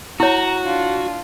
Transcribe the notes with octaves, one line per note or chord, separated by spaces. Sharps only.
E4 F#4 C#5 A#5
D4 F4